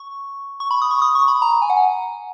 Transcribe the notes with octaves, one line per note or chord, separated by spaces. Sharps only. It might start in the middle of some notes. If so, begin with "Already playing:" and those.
Already playing: C#6
C#6
B5
D#6
C#6
D#6
C#6
B5
A#5
G#5
F#5
G#5